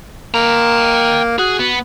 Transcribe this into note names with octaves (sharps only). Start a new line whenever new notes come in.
A#3 G5 A#5
F#4 G#4
B3